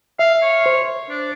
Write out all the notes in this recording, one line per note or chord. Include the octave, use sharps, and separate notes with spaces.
E5 F5
C#5
C5
D4